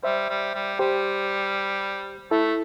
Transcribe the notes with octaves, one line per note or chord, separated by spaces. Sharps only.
G3 C5 E5
G3
G3
G3 G4 C5
A3 E4 A4